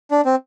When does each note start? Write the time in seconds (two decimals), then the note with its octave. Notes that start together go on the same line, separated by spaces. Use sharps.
0.11 D4
0.25 C4